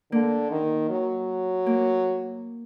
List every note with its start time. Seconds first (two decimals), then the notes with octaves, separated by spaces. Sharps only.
0.12 D3 A#3
0.51 D#3
0.89 F#3
1.66 A#3